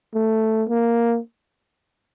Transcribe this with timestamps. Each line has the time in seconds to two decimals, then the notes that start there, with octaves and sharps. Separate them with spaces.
0.14 A3
0.69 A#3